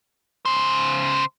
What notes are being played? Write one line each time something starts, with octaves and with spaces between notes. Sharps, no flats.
C#3 C5